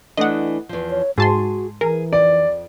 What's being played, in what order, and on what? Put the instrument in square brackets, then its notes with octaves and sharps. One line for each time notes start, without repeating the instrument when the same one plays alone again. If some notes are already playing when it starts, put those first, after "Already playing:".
[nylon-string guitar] E3 A3 D4 [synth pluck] D#5 F#5
[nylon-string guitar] E2 F3
[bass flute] C#5
[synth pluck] G#2 A5 C6 [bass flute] F#4 [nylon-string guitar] G#4
[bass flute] E3 [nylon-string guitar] G#4 [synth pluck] A#4
[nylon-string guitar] F2 [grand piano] D5